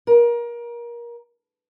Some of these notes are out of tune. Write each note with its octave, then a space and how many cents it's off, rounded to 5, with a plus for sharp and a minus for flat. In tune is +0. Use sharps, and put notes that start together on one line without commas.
A#4 +25